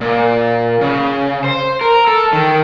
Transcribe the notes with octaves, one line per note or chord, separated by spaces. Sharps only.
A#2
C#3
C5
A#4
A4
D#3